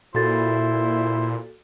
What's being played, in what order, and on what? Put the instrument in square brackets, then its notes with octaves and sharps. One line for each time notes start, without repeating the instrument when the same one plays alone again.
[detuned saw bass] A#2 [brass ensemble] E4 [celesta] F#4 A4 A6 [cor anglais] C5